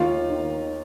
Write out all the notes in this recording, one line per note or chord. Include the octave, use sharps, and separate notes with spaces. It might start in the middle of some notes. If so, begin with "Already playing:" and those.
Already playing: D#2 F4 F5
D#3